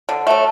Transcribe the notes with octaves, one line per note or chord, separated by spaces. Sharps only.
D3
F#3 A3